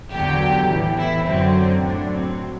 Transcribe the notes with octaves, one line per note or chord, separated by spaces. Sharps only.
E2 D3 F#3 G4
A2 E3
E4
F#2 D3 F#3 C4
A2 F#3 D4
C4